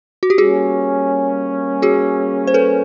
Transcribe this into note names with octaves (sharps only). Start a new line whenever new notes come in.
F#4
G4
G3 A#3 C#4 F#4 G#4
F#4 G#4
C5
A4 B4